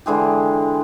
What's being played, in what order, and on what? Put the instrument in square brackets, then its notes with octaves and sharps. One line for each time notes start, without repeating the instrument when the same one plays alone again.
[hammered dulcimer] D3 E3 G#3 G4